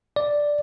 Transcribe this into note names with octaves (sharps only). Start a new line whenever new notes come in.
D5